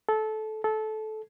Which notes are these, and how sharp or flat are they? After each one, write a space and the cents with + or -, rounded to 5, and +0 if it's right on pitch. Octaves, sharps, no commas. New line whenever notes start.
A4 -20
A4 -20